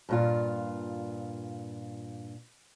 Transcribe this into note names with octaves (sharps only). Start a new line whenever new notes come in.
G2 A#2 F4